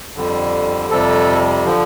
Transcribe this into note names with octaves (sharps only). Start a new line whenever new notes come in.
F2 D3 G3
F2 C3 G3 A4
D3 F3